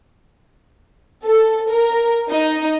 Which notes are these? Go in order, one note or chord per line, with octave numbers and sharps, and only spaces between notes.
A4
A#4
D#4